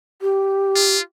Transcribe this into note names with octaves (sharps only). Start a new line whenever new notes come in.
G4
F4